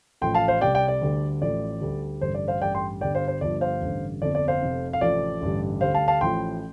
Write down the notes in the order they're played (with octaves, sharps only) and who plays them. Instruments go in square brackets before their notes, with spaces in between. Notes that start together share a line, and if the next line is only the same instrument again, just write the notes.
[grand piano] A1 A2 F3 G5 C6
F5 A5
C5 F5
C2 C3 G3 D5 G5
D5 G5
D5
D2 D3 G3
A1 A2 F3 D5
D2 D3 G3
A1 G2 D3 G3 C5
D5
C5 F5
A1 G2 G3 D5 G5
G5 C6
G1 G2 D3 G3 D5 G5
C5 F5
C5
G1 G2 F3 D5
C5 F5
A1 G2 D3
G1 F2 D3 D5
D5
C5 F5
F1 F2 C3
F5
A1 A2 F3 D5
A1 G2 D3 G3
D2 D3 G3 C5 F5
F5 A5
F5 A5
A1 A2 F3 G5 C6